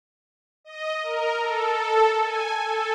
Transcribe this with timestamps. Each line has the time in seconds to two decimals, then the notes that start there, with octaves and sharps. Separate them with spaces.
0.64 D#5
1.03 A#4
1.40 A4
1.73 A4
2.22 G#5
2.61 A4